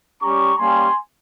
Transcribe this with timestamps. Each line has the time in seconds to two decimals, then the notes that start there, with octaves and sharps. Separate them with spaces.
0.22 G3 C#4 G4 A#5 C#6
0.59 G3 A#3 C#4 G4 G#5 C6